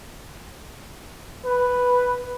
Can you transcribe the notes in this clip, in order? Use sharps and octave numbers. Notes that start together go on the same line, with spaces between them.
B4